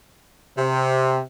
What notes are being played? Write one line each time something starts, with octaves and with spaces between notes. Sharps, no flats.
C3